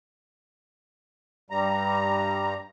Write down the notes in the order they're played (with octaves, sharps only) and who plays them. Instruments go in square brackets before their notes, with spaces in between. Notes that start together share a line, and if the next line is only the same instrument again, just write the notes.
[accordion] G2 G3 A#5